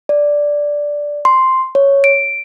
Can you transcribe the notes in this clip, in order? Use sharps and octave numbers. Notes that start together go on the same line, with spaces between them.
D5
C6
C#5
D7